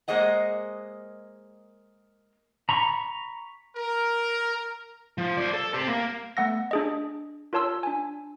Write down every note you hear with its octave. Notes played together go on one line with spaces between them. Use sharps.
G#3 A#3 G#4 C5 D#5 F#5
A#5 B5 C#6
A#4
F3
C5 D5
A4
G4 C5
A#3
A3 B3 F#5 E6 A#6
D4 G#4 D#5
F4 A#4 C#5 A5 C6 E6
D4 G#5